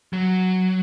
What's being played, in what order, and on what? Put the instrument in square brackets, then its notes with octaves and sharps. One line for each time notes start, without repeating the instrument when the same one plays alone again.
[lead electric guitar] F#3